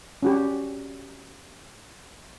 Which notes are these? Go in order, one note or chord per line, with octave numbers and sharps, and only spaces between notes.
C#4 F#4 G4